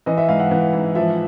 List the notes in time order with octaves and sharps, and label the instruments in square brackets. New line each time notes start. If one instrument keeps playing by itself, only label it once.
[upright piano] E3 D#5
E5
G#2 F5
F#5
E3
G#2
F3 E5